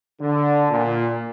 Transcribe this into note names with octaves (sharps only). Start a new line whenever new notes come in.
D3
A#2